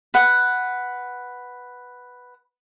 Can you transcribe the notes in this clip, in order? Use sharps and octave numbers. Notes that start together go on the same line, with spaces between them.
B4 F#5